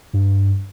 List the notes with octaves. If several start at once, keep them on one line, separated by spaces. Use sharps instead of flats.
G2